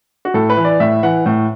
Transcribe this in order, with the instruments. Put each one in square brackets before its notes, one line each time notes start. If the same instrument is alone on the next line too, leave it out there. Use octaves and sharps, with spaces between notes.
[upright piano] F#4
A2 A4
B4
E3
D5
A2 E5
E3 F#5
A2